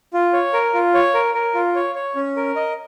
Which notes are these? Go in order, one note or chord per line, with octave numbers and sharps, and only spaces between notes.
F4
C#5
A#4
F4
C#5
A#4
A#4
F4
C#5
C#5
C#4
A#4
D#5